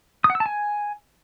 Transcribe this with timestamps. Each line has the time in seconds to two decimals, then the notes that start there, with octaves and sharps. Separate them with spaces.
0.24 D#6
0.30 F#5
0.35 E6
0.40 A5
0.46 G#5